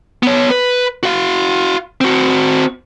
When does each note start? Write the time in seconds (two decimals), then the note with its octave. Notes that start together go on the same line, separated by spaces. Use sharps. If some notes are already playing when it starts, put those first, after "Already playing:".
0.23 B3 C#5
0.50 B4
1.03 F#4 F5
2.01 C4 F#4